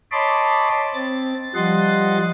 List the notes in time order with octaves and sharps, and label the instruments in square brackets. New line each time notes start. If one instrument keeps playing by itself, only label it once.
[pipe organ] C#5 D#5 A5 B5 C6 D6
C4 A6
F3 G3 D#5 F#5 C6 A6